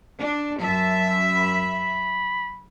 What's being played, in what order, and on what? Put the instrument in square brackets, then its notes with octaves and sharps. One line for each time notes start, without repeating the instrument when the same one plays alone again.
[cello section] D4
[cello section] F#2 E5 [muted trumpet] A5
[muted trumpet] B5